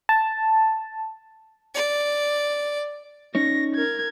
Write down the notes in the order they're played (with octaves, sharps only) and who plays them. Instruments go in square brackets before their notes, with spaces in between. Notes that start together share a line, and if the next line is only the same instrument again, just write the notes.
[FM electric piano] A5
[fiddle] D5
[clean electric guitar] C#4 D#4 C#5 [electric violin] A#6
[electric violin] A#4 G#6